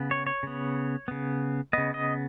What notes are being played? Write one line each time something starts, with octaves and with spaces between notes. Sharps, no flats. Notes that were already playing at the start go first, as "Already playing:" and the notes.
Already playing: C#3 B3
C#5
C#5
C#3 B3
C#3 B3
C#3 B3 D#5
D#5